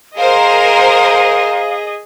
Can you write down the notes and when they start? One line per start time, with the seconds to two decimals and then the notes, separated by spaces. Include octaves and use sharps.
0.18 G#4 A#4 C5 D#5 F5